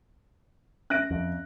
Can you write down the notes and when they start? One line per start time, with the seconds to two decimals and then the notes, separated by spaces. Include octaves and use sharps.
0.90 C#4 E5 F#6 A#6 D7
1.11 F2